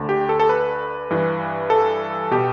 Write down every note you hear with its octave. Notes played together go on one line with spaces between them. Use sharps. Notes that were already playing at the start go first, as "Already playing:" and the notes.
Already playing: D2 D3
G4
A4
A4
B4
G2 E3
A4
B2 G4